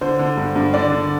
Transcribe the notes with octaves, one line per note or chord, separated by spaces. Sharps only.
D3 C5
D3
G2
G2
D3 D5
D3